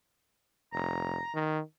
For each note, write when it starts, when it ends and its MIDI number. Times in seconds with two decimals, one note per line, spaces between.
0.73 1.19 29
0.73 1.37 82
1.34 1.60 51